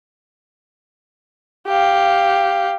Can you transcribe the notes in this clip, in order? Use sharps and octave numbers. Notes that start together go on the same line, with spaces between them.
G4 F5